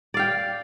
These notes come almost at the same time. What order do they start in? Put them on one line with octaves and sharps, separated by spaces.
D5 F5 G5